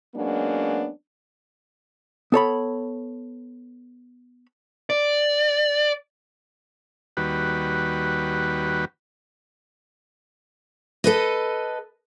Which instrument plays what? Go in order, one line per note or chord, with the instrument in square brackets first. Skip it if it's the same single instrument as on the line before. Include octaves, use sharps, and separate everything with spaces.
[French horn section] F#3 G#3 A#3 B3 C#4 D4
[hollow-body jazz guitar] B3 A4 C#5 B5
[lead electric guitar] D5
[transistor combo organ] D#2 G3 F#4 B4
[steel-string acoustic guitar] A4 B4 D#5